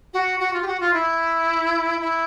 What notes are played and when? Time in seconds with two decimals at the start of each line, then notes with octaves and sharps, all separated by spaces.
0.13 F#4
0.39 F#4
0.53 F4
0.62 G4
0.67 F#4
0.80 F4
0.93 E4
2.00 E4